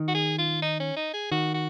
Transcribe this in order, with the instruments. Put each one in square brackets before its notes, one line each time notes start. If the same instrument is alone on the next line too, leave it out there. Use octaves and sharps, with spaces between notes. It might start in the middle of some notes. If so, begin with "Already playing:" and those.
Already playing: [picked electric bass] D#3
[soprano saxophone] F#4
G#4
F4
D#4
C#4
D#4
G#4
[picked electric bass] D#3 [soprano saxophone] F#4
[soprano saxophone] F#4